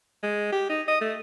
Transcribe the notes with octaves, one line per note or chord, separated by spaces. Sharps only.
G#3
G4
D#4
D#5
A3